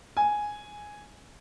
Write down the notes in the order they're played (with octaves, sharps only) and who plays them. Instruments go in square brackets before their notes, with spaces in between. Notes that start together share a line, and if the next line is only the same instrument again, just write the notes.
[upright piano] G#5